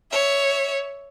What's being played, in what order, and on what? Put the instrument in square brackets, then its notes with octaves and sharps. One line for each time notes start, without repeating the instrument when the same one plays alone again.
[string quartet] C#5 E5